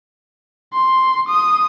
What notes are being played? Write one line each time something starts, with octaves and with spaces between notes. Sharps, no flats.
C6
D#6